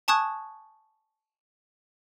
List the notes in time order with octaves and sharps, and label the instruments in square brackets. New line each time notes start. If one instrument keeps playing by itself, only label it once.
[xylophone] G#5 A5 C#6 D#6 F#6 G#6